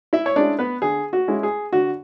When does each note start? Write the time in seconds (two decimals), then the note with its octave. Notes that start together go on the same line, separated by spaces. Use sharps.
0.13 E4 E5
0.26 C#5
0.36 G#3 C#4 D4 E4 D5
0.59 B3 B4
0.82 D3 G#4
1.13 F#4
1.28 G#3 C#4 E4
1.43 G#4
1.73 D3 F#4